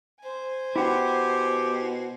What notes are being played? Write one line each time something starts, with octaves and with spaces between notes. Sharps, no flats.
C5 G#5
B2 E4 G4 F#5 G5